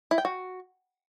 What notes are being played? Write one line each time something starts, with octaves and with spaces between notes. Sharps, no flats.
E4
G5
F#4